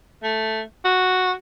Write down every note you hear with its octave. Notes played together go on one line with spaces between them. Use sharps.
A3
F#4